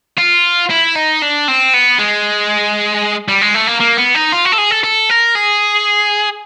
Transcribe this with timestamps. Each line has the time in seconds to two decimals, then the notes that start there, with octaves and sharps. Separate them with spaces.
0.18 F4
0.70 E4
0.96 D#4
1.22 D4
1.48 C4
1.74 B3
1.99 G#3
3.28 G3
3.42 G#3
3.55 A3
3.67 A#3
3.80 A#3
3.97 B3
4.15 D#4
4.32 F4
4.45 F#4
4.52 A4
4.58 G#4
4.71 A4
4.84 A4
5.10 A#4
5.35 G#4